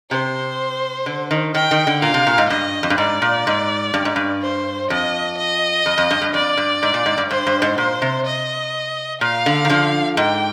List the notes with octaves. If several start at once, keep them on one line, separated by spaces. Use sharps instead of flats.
C3 C5
D3
D#3
D#3 G5
D#3
D3
A#2 F5
C3
A#2
G#2
G2 D#5
F2
G2
G#2 D5
A#2
G#2
G2
G#2
G2
C5
F2 D#5
D#5
F2
F2
G2
G2
F2 D5
G2
G#2
A#2
G#2
G2
G2 C5
G2
G#2
A#2 C5
C3
D#5
A#2 F5
D3
D#3
D3 F3
G#2 G5